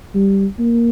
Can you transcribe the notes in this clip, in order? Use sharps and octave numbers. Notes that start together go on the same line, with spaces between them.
G3
A#3